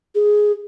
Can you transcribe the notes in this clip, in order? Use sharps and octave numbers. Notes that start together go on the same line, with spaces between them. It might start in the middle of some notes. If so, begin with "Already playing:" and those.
G#4